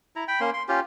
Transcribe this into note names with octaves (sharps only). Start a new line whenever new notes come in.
E4 A#5
G5 B5
A#3 C#4 C6
C6
C#4 F4 G4